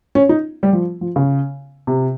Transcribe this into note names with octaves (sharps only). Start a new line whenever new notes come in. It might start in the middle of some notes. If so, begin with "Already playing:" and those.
C#4
D#4
G3
F3
F3
C#3
C3